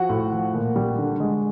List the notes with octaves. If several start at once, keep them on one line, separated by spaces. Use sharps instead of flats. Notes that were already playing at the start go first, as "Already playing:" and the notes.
Already playing: F3 F#4 F#5
A2
F3
A#2
G3
D3
G#3